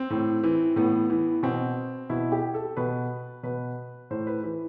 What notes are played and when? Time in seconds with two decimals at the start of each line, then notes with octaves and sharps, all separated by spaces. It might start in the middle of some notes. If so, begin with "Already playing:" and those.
Already playing: C4
0.10 A2
0.44 E3
0.76 A2 B3
1.10 E3
1.43 B2 C4
2.10 B2 E4
2.32 G4
2.54 A4
2.77 B2 B4
3.43 B2 B4
4.10 A2 C5
4.27 B4
4.43 E3 B4